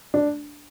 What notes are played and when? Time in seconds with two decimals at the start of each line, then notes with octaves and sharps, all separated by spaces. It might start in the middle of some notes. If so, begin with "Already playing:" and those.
0.14 D4